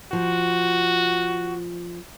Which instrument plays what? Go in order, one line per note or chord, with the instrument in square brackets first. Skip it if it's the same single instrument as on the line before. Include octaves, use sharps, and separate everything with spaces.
[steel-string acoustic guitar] F3 [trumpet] F#4